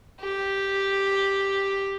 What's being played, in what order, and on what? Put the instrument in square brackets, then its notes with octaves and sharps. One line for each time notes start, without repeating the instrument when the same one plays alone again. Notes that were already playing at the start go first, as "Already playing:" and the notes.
[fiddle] G4